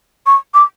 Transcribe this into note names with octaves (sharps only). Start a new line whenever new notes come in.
C#6
D6